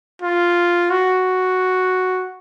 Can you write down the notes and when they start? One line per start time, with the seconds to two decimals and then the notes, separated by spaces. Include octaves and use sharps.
0.22 F4
0.91 F#4